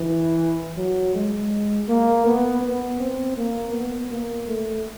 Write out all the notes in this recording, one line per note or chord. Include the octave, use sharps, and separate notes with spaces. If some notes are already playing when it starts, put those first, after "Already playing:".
Already playing: E3
F#3
G#3
A#3
B3
B3
C4
A#3
B3
A#3
A3